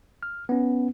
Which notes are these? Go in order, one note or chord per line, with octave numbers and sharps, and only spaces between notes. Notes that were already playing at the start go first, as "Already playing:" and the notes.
F6
B3 C#4